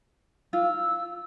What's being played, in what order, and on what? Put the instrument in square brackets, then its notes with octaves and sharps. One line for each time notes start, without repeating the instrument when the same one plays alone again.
[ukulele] F4 [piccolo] E6